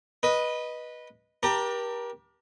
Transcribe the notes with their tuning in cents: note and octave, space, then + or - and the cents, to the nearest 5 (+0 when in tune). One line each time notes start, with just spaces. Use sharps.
B4 -15 D#5 +0
G4 +0 A#4 +40 A5 +45